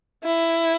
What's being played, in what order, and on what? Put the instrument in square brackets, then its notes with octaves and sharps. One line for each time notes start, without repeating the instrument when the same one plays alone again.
[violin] E4